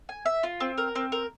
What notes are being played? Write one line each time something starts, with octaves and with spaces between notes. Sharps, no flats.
G#5
E5
F4
C4
A#4
C4
A#4